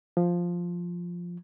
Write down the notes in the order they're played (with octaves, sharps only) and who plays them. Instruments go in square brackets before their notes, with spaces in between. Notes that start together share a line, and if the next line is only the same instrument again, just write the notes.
[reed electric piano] F3